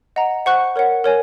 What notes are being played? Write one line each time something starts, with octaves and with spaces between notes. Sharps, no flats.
D#5 F#5 A#5
C5 F#5 C#6 F#6
A#4 C#5 F#5
A#4 C#5 G#5